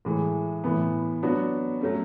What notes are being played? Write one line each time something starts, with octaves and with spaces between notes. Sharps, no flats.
A2 E3 G#3
A2 E3 B3
F#3 B3 D4 F#4
F#3 A3 C#4